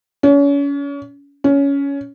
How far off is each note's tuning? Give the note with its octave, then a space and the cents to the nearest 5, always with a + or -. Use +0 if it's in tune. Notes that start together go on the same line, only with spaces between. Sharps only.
C#4 +35
C#4 +15